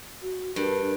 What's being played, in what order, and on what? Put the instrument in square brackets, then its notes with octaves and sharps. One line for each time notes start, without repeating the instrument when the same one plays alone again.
[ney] F#4
[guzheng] G2 [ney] A#4